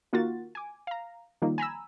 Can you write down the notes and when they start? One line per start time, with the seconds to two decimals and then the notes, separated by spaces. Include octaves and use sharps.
0.13 D#3 A#3 F4 F#4 A6
0.55 G#5 D6
0.87 F5 A#5
1.42 D#3 F3 G3 A#3 D#4
1.58 G#5 A#5 B5 E6